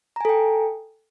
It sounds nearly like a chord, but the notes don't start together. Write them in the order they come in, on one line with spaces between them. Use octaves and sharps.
A#5 G#5 A4 G5